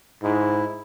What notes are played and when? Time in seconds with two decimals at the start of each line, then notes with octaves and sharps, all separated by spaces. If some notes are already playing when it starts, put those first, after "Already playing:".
0.23 G#2 E4